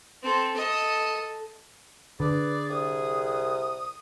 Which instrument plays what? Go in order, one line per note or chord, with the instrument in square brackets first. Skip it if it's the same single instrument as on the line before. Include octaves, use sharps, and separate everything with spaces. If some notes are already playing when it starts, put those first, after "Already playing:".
[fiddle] C4 A4
A4 D#5
[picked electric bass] D3 [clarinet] G#4 [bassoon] B4 [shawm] D5
[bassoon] C2 [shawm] D#6